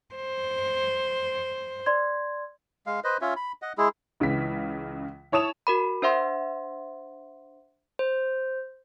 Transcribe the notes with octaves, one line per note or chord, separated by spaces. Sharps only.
C5
D5 C6 G#6
G#3 F5
B4 C5 D#5
C#4 F4 C#5 E5
B5
D#5 F#5
G#3 E4 G#4
C#2 C#3 E3 B6
E4 C#5 A5 D#6 E7 F7
F#4 A#4 B5
D4 C5 E5 F#5 C6
C5